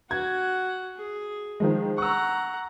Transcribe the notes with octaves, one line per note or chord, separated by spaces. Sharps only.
F#4 F#5 G#6
G#4
D#3 F3 G#3
F#5 A#5 C#6 E6